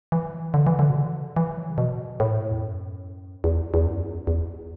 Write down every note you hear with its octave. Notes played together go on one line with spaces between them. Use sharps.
E3
D3
E3
D3
B2
C#3
D3
E3
F#3
C#3
B2
A2
E2
F#2
E2
E2
F#2
E2